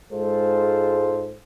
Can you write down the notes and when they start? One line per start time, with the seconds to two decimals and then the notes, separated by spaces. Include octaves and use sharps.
0.12 G#2 G#3 F4 A4 C5